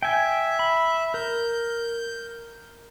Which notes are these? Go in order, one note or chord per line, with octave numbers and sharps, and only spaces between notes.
E5 G5 G#5
B5
A#4 G6